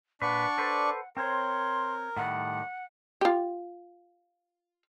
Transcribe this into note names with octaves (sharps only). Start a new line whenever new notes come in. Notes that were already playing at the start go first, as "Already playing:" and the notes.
A#2 D4 B4 D5 F#5 C#6
A4 B4 C5
C4 A#4 C5 C#5 C6
A2 D#3 G3 F#5
F4 G4